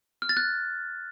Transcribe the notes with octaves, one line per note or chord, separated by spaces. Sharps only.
F6
A6
F#6